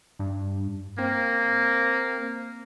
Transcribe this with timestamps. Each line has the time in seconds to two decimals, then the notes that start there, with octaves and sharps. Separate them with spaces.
0.19 G2
0.99 A#3 C4